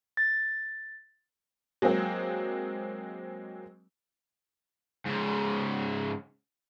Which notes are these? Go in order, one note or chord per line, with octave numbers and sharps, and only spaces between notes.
A6
F#3 G#3 A#3 C4
G#2 C#3